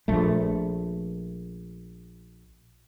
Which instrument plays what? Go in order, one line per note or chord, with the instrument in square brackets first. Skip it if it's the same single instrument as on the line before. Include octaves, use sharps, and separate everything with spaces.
[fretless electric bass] A#1 A3